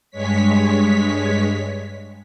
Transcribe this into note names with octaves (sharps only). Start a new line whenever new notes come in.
G2 G#3 C#5 B6